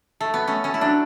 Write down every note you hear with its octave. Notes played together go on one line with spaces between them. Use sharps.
A3
B3
A3 C#4
A3 C#4
E4
F#3 D4